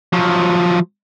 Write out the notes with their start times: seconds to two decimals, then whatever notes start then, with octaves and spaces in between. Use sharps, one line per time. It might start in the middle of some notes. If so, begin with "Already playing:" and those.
0.13 F3 F#3